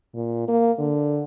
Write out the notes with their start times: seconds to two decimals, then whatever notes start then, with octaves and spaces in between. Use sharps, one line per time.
0.15 A#2
0.48 A#3
0.79 D3